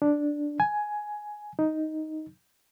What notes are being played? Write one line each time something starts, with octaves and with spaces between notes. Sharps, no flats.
D4
G#5
D#4